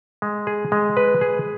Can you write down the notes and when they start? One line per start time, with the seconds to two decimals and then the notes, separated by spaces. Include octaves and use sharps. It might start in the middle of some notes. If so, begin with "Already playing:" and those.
0.22 G#3
0.47 G#4
0.72 G#3
0.97 B4
1.21 G#4